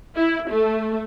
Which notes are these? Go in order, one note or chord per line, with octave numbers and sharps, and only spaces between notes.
E4
A3